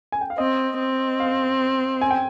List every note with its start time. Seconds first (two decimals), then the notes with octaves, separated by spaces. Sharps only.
0.12 G#5
0.21 G5
0.30 F5
0.38 C4 D#5
0.79 C4
1.20 F5
2.01 G#5
2.11 G5